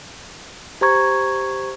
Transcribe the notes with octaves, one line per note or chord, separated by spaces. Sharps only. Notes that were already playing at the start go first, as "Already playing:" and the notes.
G4 C5 A#5 C#6 G#6